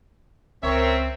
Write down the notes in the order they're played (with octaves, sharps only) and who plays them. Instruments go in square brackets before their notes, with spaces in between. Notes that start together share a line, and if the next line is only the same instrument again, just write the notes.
[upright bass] C#2 [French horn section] C4 [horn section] A#4 C#5 [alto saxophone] E5